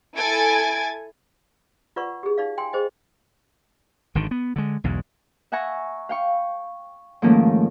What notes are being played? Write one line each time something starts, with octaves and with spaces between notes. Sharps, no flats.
E4 A4 G#5 G#6 A6 D7
F4 B4 D5 F#5 C#6
G4 G#4
D#4 D5 F5
G5 G#5 C6
G#4 C5 D#5 G5
G#1 D3 D#3
B3
D3 G#3
B1 E2 G#2
E5 F#5 G#5 A#5 C#6
F5 G5 C#6
G#2 D#3 F3 A3 A#3 C#4